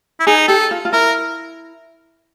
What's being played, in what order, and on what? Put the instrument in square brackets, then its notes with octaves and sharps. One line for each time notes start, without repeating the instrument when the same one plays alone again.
[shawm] E4
[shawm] D#4 [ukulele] G#4
[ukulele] G4 [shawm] A4
[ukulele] F4
F4
[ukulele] E4 [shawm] A#4